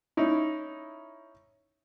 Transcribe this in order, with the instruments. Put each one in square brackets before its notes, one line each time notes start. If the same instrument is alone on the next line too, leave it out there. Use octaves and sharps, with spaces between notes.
[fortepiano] C#4 D#4 E4